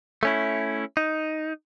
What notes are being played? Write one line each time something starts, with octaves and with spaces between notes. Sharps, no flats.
A3 C#4 E4
D#4